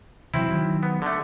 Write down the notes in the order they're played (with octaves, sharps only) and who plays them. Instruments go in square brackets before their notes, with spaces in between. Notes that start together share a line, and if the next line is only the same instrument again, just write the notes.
[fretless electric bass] C3 E3 F#3 [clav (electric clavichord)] C4 E4
[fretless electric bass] D#3 F#3
[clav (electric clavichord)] B3
D3 A3